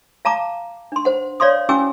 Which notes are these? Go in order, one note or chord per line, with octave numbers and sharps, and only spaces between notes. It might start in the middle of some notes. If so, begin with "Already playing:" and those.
F5 A5 A#5 D6
D4 C6
C5 F#5
C#5 D5 F5 C6 D#6
C#4 E4 F#4 G#5 D6 E6